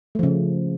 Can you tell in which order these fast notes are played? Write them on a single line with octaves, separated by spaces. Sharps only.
A3 F3 C#3